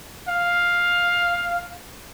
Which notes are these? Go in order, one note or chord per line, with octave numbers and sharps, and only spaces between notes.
F5